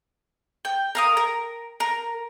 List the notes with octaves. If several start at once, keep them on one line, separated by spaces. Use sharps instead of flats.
G5
A#4 F5 D#6
A#4
A#4